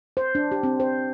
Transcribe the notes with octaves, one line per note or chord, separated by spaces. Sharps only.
C5
D4
G4
C4
C5